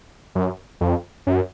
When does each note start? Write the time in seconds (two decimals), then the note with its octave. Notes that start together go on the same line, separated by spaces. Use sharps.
0.35 F#2
0.81 F2
1.27 F#2